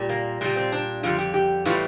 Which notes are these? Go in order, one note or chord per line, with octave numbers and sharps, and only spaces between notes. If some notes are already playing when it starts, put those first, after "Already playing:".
Already playing: A#2 G3
A#3
A#2 G3 A#3
C4
D4
F2 D3 G3 F4
G4
G4
A2 E3 G3 F4